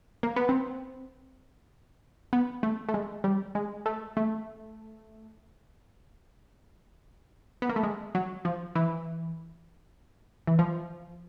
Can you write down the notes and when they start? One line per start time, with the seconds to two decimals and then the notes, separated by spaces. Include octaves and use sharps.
0.23 A#3
0.36 B3
0.49 C4
2.33 B3
2.63 A3
2.89 A3
2.94 G#3
3.24 G3
3.55 G#3
3.86 A3
4.17 A3
7.62 B3
7.69 A#3
7.76 A3
7.83 G#3
8.15 F#3
8.45 F3
8.75 E3
10.47 E3
10.59 F3